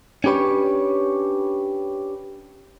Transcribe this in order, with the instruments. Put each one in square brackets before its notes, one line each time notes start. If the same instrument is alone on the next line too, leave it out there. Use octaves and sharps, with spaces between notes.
[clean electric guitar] C#4 D4 G4 B4 C#5